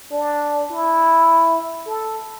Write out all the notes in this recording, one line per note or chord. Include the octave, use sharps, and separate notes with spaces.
D4
E4
A4